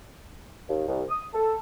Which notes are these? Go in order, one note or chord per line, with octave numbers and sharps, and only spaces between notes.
D#2
C2
D#6
A4